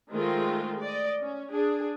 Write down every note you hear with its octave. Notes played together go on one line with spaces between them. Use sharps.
D#3 G#3 A3 C4 F4
D5 D#5
C#4
D4 G#4